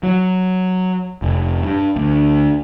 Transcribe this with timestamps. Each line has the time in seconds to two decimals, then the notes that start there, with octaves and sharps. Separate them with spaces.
0.03 F#3
1.22 F1
1.62 G2
1.96 D2